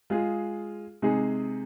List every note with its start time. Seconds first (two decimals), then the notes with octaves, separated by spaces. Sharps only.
0.10 G#3 F4 G#4
1.02 C3 G#3 D#4 G#4